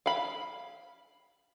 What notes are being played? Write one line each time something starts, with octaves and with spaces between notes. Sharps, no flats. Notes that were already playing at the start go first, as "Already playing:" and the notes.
F5 B5